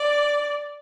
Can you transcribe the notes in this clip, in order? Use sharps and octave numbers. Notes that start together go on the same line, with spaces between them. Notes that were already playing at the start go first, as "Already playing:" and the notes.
Already playing: D5